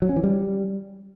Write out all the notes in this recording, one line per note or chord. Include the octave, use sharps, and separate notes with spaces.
F#3
C#4
E3
G3